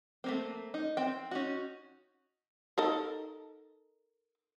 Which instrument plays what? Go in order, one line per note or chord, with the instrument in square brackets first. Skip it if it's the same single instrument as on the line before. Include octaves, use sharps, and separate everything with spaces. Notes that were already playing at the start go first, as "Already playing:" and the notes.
[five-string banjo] A3 A#3 C4
D#4
C4 G5
C#4 D#4 F#4
[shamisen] D#4 A4 A#4